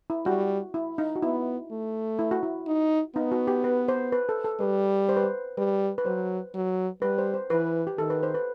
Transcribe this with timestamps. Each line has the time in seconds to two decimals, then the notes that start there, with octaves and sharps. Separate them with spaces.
0.10 E4
0.25 G3 F#4
0.74 E4
0.98 D#4
1.16 F#4
1.22 B3 E4
1.71 A3
2.19 E4
2.31 F#4
2.43 E4
2.67 D#4
3.16 B3 D#4
3.32 F#4
3.47 G4
3.64 B4
3.88 C5
4.12 B4
4.29 A4
4.45 A4
4.60 G3 B4
5.09 C5
5.17 B4
5.24 C5
5.57 G3 B4
5.98 B4
6.06 F#3 C5
6.54 F#3
7.01 G3 B4
7.18 C5
7.34 C5
7.50 E3 B4
7.87 G4
7.98 D#3 A4
8.10 B4
8.23 C5
8.34 B4